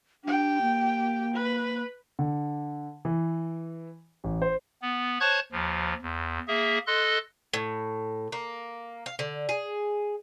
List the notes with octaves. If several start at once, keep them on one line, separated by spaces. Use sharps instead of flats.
D4 G4 G5
A#3
B4
D3
E3
A1
C5
B3
C5 C#5 A5 C#6 F#6 G#6
D#2 F3
E2
A#3 G#4 E5
A4 D#5 C6 F#6
A2
A#3
F5
D3
G#4